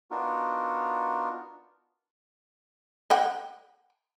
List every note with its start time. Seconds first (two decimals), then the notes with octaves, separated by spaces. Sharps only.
0.11 B3 D4 D#4 F4 F#4 A#4
3.10 D#5 F#5 G5